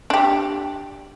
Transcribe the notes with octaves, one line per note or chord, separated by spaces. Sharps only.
D4 G4